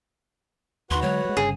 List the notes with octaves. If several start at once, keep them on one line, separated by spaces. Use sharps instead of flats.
D#2 D#3 F#4 B4 F#5 C6
D3 F#3 G#3 C#5
F#3 G#3
G1 G2 C#3 G#4